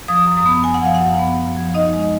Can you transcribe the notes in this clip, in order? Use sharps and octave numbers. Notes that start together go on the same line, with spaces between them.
F3 D#6
F#2
D#6
B3
F#2 G#5
F#5
F3 F5
F#5
F#2
B3
F#2
F3
D#4 D#5
G#3